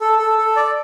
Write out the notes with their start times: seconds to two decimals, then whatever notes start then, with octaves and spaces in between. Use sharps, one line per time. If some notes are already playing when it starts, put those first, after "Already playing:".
0.01 A4
0.19 A4
0.38 A4
0.56 D5